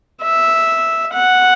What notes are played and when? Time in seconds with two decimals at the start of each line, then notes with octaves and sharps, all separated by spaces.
0.22 E5
1.14 F#5